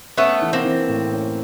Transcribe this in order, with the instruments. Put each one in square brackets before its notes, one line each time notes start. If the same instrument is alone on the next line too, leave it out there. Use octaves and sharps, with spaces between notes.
[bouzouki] A3 B3 [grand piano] C#4
[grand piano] E3
[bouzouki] A#3 C4
[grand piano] E3
A2
C#4